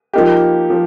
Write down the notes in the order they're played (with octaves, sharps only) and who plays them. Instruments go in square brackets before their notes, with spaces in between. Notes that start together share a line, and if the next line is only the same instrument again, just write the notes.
[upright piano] F3 A#3 D#4 G4
F3